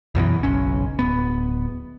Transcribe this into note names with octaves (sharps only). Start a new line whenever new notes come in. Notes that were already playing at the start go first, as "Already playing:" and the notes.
C2 F#2 B2 E3
F#1 B1 C#4
D1 B3